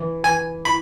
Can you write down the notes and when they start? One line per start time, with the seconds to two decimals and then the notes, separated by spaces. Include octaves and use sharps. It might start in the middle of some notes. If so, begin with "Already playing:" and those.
Already playing: E3
0.23 E3 G#5
0.65 E4 B5